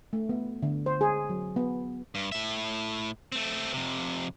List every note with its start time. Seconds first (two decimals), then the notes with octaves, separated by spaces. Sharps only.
0.13 A3
0.29 B3
0.63 D3
0.86 C5
1.01 G#4
1.30 F#3
1.56 B3
2.15 G2
2.32 A2 E5
3.32 A3 C4
3.73 F2 C3